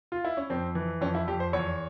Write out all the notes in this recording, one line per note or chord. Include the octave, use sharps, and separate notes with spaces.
F4
E4
C#4
F2 C4
E3
F2 C#4
E4
F2 G4
C5
E2 C#5